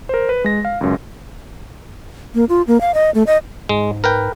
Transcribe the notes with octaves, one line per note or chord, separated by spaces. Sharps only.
A#4 C5
B4
G#3 A#6
F5
C#2 F#2
A#3
F4
A#3
F5
D#5
A3
D#5
G#2 G#3
A#4 B4 G5